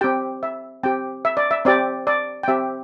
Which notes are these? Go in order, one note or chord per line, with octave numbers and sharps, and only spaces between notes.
C4 G4 G5
E5
C4 G4 G5
E5
D5
E5
C4 G4 D5
D5
G5
C4 G4 E5